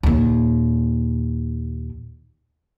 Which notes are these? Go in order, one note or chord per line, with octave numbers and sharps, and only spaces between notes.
D#2 A#2